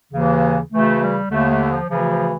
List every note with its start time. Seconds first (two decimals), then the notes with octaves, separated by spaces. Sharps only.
0.12 D#2 C#3 E3
0.72 D2 C#3 E3 A3
1.00 G3
1.30 D#2 D3 A3
1.50 A3
1.70 F3
1.89 D2 C#3 E3 F3
2.08 F3